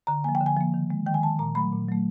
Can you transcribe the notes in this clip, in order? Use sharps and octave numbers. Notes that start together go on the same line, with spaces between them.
D3 A#5
F3 A#3 G#5
G5
D3
G#5
F3 A#3
D#3
G#3
D#3 G5
G#5
G#3 A5
A#2 A#5
F#3 A3 B5
A#2
F#3 A3